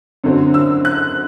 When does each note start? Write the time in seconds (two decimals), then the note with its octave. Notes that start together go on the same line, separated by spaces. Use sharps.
0.24 F#2 D3 F#3 C4
0.54 E6
0.85 F#6